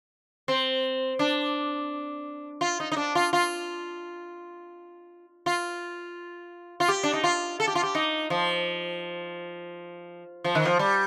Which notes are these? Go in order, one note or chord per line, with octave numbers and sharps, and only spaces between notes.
C4
D4
F4
D#4
D#4
D4
F4
F4
F4
F4
G4
D4
D#4
F4
A4
G4
F4
G4
D#4
F3
F3
D#3
F3
G3